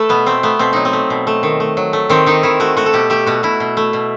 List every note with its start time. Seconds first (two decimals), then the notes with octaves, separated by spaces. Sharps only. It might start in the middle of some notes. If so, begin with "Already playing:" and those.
Already playing: A3 A4 B4
0.09 B2 B3
0.26 A3 C4
0.43 A3 B3
0.59 B2 C4
0.73 F#3 D#4
0.85 C4
0.93 A3
1.10 B2
1.27 A3
1.43 D#3
1.60 A3
1.77 F#3
1.93 A3
2.10 D#3 C4
2.26 D#3 D#4
2.43 D#3 E4
2.60 A3 F#4
2.77 A3 F#4
2.86 A4
2.93 B2 G4
3.10 A3 G4
3.26 B2 F#4
3.43 B2 E4
3.60 B2
3.77 A3
3.93 B2